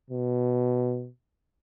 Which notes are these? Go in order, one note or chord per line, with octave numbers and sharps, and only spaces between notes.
B2